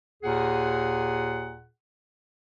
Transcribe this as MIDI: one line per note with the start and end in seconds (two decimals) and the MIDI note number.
0.23 1.66 39
0.23 1.66 46
0.23 1.66 68
0.23 1.66 78